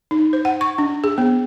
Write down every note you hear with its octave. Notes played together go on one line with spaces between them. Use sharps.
D#4
C5
F#5
C#6
D4
G#4
B3